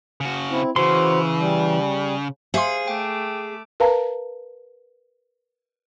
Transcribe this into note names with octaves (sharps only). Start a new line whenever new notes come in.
C#3 F#4
C4 E4
C#3 E3 F#4 C5 C6
G3
G#4 C5 E5 F5 C6
A3 G5 D6
A#4 B4 F5 A5 A#5